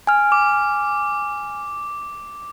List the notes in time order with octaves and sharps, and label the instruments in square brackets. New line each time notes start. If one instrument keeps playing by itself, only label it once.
[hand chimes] G#5 F6
[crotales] D6